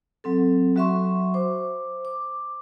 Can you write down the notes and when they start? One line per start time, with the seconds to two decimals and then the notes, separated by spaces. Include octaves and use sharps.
0.24 F#3 C4 A4
0.76 F#3 F#4 E5 C6 C#6
1.34 C5 D6
2.05 D6